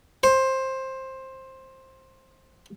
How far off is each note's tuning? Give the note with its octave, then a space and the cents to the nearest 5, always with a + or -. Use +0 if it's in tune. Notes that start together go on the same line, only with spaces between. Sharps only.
C5 +15